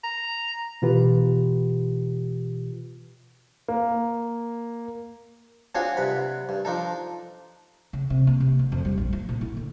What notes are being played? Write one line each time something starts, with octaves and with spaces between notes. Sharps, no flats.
A#5
B2 E3 F4 G4 B4
A#3
C4 D4 F4 F#4 G#4 C#5
G2 C3 F#5 B5
G2
F3 D4 D#4 A4
C#3
C3
A#3
C3
D3
F2
G3
A#1
F3
A#2
E4
D3